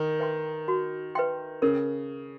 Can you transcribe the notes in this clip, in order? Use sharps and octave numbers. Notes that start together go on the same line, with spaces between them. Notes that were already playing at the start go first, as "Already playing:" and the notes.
Already playing: D#3
B4 E5 G5 C6
F#4
B4 E5 G5 C6
C#3 A#4